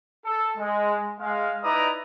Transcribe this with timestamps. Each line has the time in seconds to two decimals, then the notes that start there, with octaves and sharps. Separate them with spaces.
0.25 A4
0.57 G#3
1.20 G#3 F5
1.63 D#4 E4 B4 D5 A#5 D#6